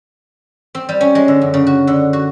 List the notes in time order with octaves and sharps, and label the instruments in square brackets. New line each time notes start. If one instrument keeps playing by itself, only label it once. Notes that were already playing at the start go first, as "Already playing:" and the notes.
[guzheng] C4
G3
C#4
G#3
D3
F#2
C#3
F#4
D3
F#4